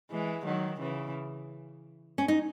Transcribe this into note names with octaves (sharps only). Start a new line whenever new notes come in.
E3 G#3
D#3 F#3
C#3 E3
C#4
D#4